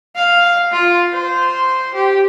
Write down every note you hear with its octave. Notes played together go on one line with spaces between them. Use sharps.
F5
F4
C5
G4